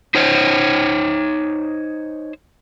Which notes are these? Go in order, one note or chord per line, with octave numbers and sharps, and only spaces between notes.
D#4 C5 C#5